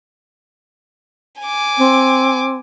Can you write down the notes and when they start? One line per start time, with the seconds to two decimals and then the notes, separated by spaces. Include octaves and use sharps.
1.41 G#5 D6
1.78 C4